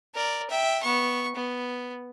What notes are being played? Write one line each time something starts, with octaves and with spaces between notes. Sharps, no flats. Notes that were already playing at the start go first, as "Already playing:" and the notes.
A#4 D5
E5 G5
B3 C#6
B3